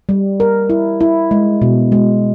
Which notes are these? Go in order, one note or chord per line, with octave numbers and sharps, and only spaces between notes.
G3
A#4
E4
E4
G#3
B2
G#3